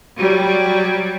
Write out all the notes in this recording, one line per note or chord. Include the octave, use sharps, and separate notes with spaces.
F#3 G3